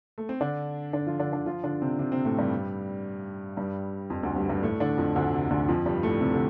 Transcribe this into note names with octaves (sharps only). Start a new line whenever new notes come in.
A3
C4
D3 D4
D3 D4
F3 F4
D3 D4
D3 D4
F3 F4
D3 D4
C3 C4
C3 C4
C3 C4
A2 A3
G2 G3
G2 G3
F2 F3
D2 D3
G2 G3
G2 G3
A2 A3
D3 D4
F2 F3
D2 D3
C3
D2 D3
F2 F3
G2 G3
A2 A3
C3 C4
D3